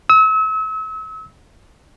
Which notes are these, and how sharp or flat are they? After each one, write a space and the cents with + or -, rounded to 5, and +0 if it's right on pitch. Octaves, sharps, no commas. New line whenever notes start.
E6 -40